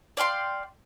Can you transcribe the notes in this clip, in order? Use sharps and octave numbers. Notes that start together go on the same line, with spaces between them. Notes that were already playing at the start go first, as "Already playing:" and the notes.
D5 F5 G5 C6